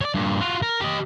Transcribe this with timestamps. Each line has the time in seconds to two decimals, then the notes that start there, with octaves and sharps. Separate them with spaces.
0.01 C#5 D5
0.15 G2 A#2
0.41 F4 F#4
0.62 A#4
0.81 G4 D#5